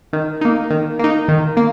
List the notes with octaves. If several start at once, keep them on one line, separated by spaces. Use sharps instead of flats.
D#3
A#3 D#4
D#3
A#3 D#4
D#3
A#3